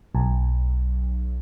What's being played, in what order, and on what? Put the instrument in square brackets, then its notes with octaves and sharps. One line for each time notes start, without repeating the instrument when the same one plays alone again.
[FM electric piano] B1